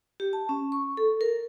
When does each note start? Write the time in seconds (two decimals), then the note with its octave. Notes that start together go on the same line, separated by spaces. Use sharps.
0.20 G4
0.33 A5
0.49 C#4
0.72 C#6
0.97 A4
1.21 A#4